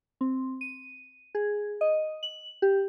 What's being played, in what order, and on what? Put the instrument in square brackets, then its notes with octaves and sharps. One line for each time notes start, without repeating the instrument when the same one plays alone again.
[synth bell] C4
D#7
G#4
D#5
F#7
G4